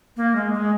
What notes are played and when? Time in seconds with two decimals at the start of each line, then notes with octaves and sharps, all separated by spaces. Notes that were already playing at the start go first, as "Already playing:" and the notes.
0.17 A#3
0.36 G#3
0.54 G#3